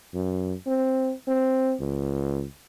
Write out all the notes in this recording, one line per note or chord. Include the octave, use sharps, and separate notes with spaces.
F#2
C4
C4
C#2